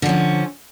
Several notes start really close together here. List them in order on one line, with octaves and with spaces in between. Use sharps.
D3 F3 C#4